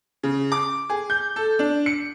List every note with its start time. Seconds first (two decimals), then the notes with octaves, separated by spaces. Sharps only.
0.23 C#3
0.52 D6
0.89 G#4
1.10 G6
1.36 A4
1.59 D4
1.86 C#7